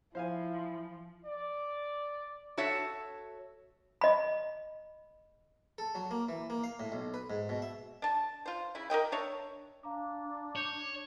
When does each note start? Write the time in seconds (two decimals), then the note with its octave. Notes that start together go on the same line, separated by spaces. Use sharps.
0.15 F3 E4 C5 F5 G#5
1.25 D5
2.57 F#4 A4 C#5 E5
4.01 D#5 B5
5.78 A4
5.95 F#3
6.11 A#3
6.29 E3
6.50 A#3
6.64 F5
6.80 A2
6.92 B1
7.14 B4
7.30 G#2
7.49 B2
7.62 E5
8.02 D4 A5
8.46 F4 C5
8.75 C#3 E4
8.90 A#4 D5 D#5 G5
9.12 D4 C#5 E5
9.83 D4 F5 A#5 D6
10.56 C#5 D6 G6 E7